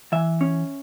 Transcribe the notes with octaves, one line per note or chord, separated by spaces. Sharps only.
E3 E5
C#4